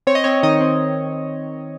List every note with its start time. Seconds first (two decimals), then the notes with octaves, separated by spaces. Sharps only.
0.07 C4 C#5
0.15 D#5
0.24 C4 C#5
0.43 D#3 D#5
0.61 C4